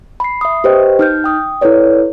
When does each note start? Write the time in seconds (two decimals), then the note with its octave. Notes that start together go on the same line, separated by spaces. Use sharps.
0.20 B5 C7
0.41 E5 D#6
0.64 G4 B4 C5 D#5 G5
0.99 D#4 F6 G6
1.24 G5 D#6
1.61 E4 A4 B4 C#5 D5